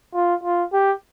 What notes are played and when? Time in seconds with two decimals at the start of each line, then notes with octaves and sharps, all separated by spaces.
0.14 F4
0.43 F4
0.73 G4